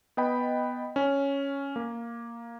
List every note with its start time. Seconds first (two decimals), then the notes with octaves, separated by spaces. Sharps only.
0.17 B3 D#5 G5 B5
0.96 C#4
1.76 A#3